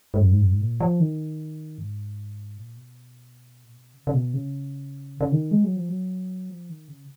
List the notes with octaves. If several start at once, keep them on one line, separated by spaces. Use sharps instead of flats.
G#2
F#2
G#2
F#2
G#2
A#2
F3
D#3
G#2
A#2
B2
A#2
B2
C#3
C#3
B2
C#3
C#3
D#3
G#3
F#3
F3
F#3
F3
D#3
C#3